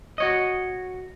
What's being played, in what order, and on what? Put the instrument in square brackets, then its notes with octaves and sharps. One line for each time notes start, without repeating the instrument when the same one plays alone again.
[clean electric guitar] F#4 C#5 D#5